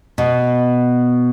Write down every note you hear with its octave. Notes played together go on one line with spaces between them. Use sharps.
B2